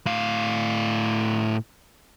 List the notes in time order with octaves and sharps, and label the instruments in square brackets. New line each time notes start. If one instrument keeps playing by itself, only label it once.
[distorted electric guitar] A2 F5